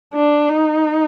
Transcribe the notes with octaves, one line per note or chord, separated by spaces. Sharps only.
D4
D#4